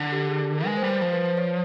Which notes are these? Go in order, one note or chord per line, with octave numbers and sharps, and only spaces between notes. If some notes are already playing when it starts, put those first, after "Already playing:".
Already playing: D3
G4
G#4
A#4
G#3 B4
C5
G3
C5
F3 C5
B4
C5
C#5